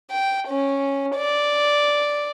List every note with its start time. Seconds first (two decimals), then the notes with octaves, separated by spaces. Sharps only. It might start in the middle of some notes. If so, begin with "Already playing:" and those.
0.10 G5
0.48 C#4
1.16 D5